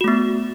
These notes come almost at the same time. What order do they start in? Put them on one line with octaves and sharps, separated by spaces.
F#4 A3 B3